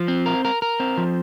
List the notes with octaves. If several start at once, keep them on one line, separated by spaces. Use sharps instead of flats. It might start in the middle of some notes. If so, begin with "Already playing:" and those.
Already playing: F3
C4
A#4
A#4
A#4
C4
F3